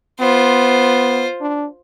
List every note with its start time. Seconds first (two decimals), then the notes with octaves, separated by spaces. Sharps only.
0.20 B3 F4 C5
1.41 D4